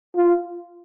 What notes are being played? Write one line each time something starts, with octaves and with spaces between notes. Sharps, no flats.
F4